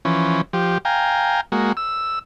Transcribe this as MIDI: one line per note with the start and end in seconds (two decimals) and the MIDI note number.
0.05 0.41 52
0.05 0.41 53
0.05 0.41 61
0.53 0.78 53
0.53 0.78 67
0.85 1.41 77
0.85 1.41 79
0.85 1.41 80
0.85 1.41 82
1.52 1.72 56
1.52 1.72 58
1.52 1.72 66
1.77 2.19 88